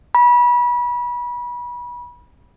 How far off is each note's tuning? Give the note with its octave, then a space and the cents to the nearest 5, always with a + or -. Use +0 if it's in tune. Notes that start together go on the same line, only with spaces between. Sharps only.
B5 -30